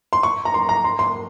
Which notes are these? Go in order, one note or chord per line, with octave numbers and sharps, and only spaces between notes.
C6
C#6
A#5
C6
A#5
C6
C6